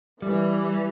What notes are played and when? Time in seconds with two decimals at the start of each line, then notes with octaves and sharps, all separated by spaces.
0.22 E3 G3